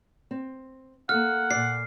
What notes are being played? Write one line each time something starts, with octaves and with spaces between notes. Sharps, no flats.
C4
A#3 A4 F5 F#5 F6
A#2 D5 C7